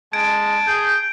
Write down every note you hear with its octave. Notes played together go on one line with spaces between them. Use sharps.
G#3 A5 G#6 D7
G#4 G6